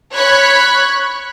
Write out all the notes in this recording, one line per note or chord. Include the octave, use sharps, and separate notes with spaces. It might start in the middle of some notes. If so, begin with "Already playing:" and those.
C#5 B5 C#6 F#6 G#6